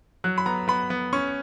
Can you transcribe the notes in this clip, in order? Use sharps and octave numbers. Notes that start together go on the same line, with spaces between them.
F#3 F#6
B5
B3 A#5
B3 B5
B3
C#4 C#6